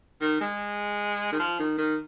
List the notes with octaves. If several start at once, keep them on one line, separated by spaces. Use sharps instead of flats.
D#3
G#3
D#3
F3
D#3
D#3